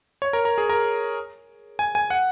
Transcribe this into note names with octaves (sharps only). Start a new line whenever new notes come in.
C#5
A#4
A#4
G#4
A#4
G#5
G#5
F#5